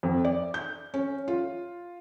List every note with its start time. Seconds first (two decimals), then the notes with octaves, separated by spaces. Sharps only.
0.03 F2
0.25 D5
0.54 G6
0.94 C#4
1.28 F4